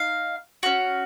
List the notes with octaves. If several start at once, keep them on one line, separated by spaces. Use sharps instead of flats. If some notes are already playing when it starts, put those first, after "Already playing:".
Already playing: D#4 F5
C#4 F#4